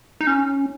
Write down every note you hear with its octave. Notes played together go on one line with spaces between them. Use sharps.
D#4
C#4